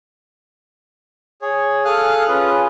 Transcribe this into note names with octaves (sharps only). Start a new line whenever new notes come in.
G#4 C#5
G#4 A4 F5 D#6 F6 F#6
C#4 F4 G#4 B4